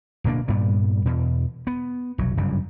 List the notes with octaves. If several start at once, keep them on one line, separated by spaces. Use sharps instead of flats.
D1 B2 A#3 D4
G2 A#2 G3 B3
E2 B2
B3
F1 B1 F#3
G1 F#2 C#3 G3